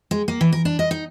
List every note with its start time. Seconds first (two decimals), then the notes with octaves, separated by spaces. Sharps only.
0.11 G#3
0.28 A#3
0.41 E3
0.52 A#4
0.65 D4
0.79 D#5
0.91 D#4